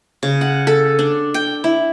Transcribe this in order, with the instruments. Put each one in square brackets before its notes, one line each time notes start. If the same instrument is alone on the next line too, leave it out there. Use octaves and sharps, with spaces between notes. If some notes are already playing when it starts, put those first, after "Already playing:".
[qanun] C#3
F#5
A4
D4
G5
E4